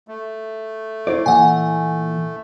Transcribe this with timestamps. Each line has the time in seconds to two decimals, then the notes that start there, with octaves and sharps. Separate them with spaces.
0.08 A3
1.07 E4 C5 D5
1.26 A#2 E3 F#5 G#5